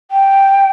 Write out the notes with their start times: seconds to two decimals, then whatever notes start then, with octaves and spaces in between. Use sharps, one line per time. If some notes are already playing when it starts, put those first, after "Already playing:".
0.11 G5